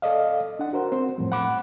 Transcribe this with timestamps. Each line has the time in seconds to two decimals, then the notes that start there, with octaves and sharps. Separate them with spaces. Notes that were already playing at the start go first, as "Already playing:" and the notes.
0.02 A4 D5 D#5 F5
0.59 D4 F#5
0.73 F#4 A#4 C5
0.92 C4 C5
1.18 F#2 A2 F3 G3
1.32 F#5 B5 D6 F#6